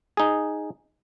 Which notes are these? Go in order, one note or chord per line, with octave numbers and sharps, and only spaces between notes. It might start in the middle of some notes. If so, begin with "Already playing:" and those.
D#4 G#4